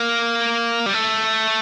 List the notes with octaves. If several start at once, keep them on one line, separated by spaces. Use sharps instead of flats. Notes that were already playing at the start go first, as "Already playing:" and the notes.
Already playing: A#3
G3
A3